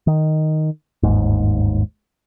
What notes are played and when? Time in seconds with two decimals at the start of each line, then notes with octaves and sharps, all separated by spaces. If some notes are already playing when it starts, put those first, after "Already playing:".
0.07 D#3
1.03 G1 D#2 G#2